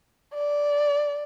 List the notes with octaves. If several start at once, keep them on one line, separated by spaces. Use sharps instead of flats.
D5